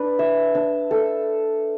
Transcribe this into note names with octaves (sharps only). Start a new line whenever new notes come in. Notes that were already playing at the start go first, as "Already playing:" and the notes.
Already playing: D4 B4
E5
D4
A4